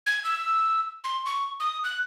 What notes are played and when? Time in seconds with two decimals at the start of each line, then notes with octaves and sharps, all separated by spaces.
0.06 G#6
0.24 E6
1.04 C6
1.25 C#6
1.60 D#6
1.84 F#6